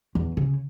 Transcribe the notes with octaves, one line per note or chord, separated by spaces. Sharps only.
E2
C#3